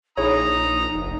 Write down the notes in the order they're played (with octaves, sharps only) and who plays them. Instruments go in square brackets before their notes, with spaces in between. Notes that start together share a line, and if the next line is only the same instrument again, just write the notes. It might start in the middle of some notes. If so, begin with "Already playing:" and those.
[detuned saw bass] A#1 [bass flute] D#4 [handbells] E4 G#4 C#5 [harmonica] A#5 D#6
[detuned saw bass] F1